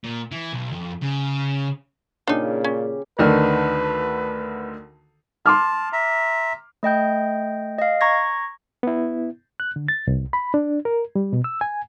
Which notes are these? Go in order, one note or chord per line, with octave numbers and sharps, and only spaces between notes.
A#2
E3
B1
F2
C#3
A#2 C#3 D4 D#4 G4
C#4
D2 D3 D#3 B4
A5 C6 D6 F6
E5 A#5
A3 D#5 G5 G6
D#5 F5
A#5 C#6 G#6 A#6
B3 E4
F#6
D3
A6
C2
B5
D4
A#4
G3
B2
E6
G#5